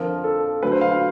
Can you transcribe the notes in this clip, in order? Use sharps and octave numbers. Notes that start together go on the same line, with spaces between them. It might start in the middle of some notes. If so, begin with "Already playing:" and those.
Already playing: F2 D3 F3 A#4
A4
D2 D3 F#3 B4
C5
F5
F5